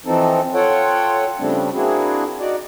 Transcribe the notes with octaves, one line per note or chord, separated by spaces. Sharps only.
E3 F3 C4 D#4 A4
F4 A4 C#5 F#5 G5
C#3 F3 G3 A3 C4 D4
A#3 C4 D4 E4 F#4 G#4
D#4 F#4 D5